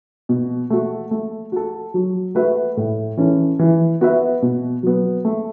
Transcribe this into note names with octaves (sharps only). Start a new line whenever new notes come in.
B2
A3 F#4
A3
F#4 A4
F#3
A3 F#4 B4 E5
A2
E3 C#4 A4
E3
B3 F#4 B4 E5
B2
F#3 B3
A3